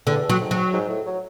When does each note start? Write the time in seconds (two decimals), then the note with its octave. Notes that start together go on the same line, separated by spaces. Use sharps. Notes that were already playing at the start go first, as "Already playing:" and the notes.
0.07 E2 D3
0.29 F#3
0.40 G#2
0.51 F#3
0.73 G#2
0.89 A2
1.06 F#3